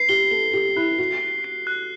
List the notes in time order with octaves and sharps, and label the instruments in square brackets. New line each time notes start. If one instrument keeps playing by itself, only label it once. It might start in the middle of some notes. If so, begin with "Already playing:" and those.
Already playing: [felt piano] B4 [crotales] C7
[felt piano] G4 [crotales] G7
[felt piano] A4 [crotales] G7
[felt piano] G4 [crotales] G7
[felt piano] E4 [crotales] F#6
[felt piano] F#4 [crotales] G7
[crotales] G7
C7
F#6